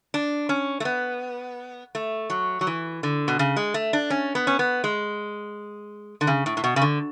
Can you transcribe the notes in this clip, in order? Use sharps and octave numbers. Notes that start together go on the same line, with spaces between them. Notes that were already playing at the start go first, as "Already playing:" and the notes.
D4
C#4
A3
B3
A3
F#3
F#3
E3
D3
B2
C#3
G#3
A3
D4
C#4
B3
C#4
B3
G#3
D3
C#3
A2
A2
B2
C#3
D3